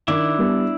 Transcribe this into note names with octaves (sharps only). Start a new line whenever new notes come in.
D#3 D4 E4
G3 B3